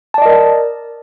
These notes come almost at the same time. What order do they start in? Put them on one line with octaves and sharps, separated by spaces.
A5 D5 D#5 A#4